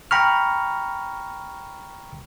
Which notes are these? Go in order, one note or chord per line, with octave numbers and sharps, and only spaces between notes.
G5 A#5 B5 C#6 F6